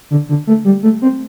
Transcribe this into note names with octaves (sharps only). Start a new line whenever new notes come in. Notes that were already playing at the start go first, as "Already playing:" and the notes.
D3
D3
A3
G3
A3
C4